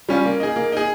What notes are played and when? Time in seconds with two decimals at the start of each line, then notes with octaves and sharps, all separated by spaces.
0.09 G3 C#4 F4
0.25 A#3
0.40 D#4 G#4
0.56 A#3
0.72 D#4 G#4